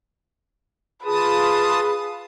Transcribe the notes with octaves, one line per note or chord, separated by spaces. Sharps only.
F4 G#4 B4 A5 D#6